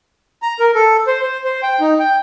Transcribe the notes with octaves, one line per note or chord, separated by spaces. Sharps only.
A#5
A#4
A4
C5
C5
C5
G5
D#4
G5